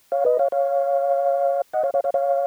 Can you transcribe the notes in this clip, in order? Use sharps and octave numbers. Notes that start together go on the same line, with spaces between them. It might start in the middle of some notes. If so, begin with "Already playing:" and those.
C#5 F5
B4 D#5
C#5 F5
C#5 F5
D#5 F#5
C#5 F5
C#5 F5
C#5 F5
C#5 F5